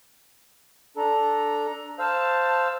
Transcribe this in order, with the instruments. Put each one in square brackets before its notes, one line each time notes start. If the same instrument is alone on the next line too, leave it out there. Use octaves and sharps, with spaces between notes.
[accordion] D4 A4 [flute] A#5
[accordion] C5 F5 E6 [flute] A5